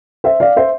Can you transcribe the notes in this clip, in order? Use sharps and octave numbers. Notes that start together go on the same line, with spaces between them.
C5 E5
D5 F5
C5 E5